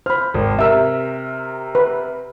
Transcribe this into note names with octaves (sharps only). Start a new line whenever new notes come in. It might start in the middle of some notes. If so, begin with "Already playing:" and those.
C5 B5 F6
G#1
C3 A#4 E5 E6
B4